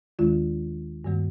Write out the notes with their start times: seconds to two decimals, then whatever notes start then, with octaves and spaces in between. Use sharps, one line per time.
0.19 D#2 D#3 G#3 F4
1.04 G2 D#3 G3 A#3